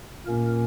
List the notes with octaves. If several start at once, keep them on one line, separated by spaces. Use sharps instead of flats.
A#2 A#3 C#4 A#4